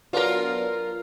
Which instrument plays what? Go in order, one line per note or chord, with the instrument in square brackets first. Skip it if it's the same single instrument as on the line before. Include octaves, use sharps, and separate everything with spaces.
[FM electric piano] F#3 B3 D4 [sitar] F4 A#4